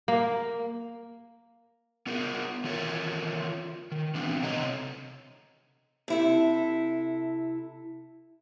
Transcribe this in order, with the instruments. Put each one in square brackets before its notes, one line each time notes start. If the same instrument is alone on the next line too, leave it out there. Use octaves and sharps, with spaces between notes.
[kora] A#3
[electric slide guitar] B3 F4 G#4 A#4
D#3 E3 F4 A4 A#4 C#5
D#3
E3 B3 C4 D4
C3 C4 A4 C#5 D#5 A#5
[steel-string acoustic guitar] C3 E4 A4